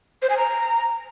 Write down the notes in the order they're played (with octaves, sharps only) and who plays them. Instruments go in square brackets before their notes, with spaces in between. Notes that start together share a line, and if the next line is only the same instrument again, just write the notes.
[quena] C5
G#5
A#5